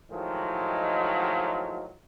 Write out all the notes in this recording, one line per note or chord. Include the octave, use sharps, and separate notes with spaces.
A2 D#3 F3 F#3 G#3